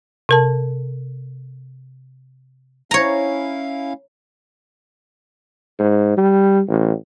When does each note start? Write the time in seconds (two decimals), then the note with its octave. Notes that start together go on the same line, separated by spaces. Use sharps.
0.29 C3 A#4 A5
2.91 C#4 E4 C#5 F5 A#5
5.79 G#2
6.17 G3
6.68 A1